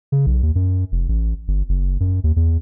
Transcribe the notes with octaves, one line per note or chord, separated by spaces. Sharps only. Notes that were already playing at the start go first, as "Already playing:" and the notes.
C#3
B1
D#2
F#2
F1
A1
G1
F#1
F#2
D#2
E2